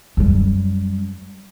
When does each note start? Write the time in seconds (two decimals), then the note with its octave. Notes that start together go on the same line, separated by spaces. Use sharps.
0.17 F#2 G3